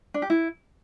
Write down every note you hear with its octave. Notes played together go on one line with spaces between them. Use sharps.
D4
G4
E4